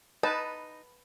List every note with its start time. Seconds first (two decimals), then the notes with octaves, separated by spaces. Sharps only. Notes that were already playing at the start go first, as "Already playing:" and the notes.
0.23 D#4 B4 A5